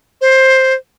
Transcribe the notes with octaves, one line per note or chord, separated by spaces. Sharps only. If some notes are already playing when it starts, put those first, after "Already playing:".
C5